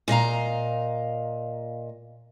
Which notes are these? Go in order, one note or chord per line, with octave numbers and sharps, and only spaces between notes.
A#2 D#5 F5 A#5